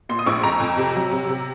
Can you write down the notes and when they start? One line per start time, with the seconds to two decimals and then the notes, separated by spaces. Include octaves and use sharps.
0.09 A#2 C6
0.19 D#6
0.26 A#1 C#6
0.43 F2 A#5
0.60 F2
0.77 C3
0.95 F#3
1.11 C3
1.29 C3